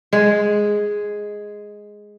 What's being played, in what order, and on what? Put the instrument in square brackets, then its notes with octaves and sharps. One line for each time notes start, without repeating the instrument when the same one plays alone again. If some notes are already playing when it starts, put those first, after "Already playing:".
[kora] G#3 G#4